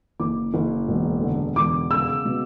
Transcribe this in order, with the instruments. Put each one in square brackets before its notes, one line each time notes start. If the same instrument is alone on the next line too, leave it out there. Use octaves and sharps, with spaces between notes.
[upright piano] F#1 D6
F#1
E1
D3
E1 D6
C#3 E6
B2